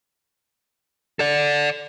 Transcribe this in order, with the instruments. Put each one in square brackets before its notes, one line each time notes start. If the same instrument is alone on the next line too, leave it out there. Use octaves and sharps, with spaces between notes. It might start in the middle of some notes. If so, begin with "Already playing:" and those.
[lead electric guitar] A4 D5